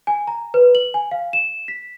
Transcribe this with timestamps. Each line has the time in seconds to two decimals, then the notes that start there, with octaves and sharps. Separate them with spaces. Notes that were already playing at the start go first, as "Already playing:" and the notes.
0.07 G#5
0.27 A#5
0.54 B4
0.75 F#7
0.94 G#5
1.11 F5
1.33 E7
1.68 B6